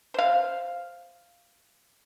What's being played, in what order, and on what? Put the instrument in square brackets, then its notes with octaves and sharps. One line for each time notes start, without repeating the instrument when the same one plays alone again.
[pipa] C5 F5